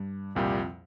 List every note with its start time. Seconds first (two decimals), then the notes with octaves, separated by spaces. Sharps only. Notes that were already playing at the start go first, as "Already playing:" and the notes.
Already playing: G2
0.35 C2 F2 A#2 G3